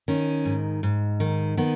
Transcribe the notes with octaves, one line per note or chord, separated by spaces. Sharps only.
D#3 C#4
G#2
G#2
D#3
D#3 B3